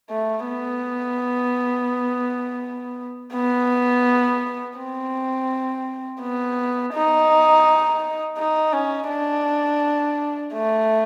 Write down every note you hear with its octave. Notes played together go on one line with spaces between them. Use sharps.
A3
B3
B3
C4
B3
D#4
D#4
C#4
D4
A3